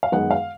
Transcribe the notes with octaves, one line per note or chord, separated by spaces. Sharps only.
F5
F#2 D#3 G#3 B3 F#5
F5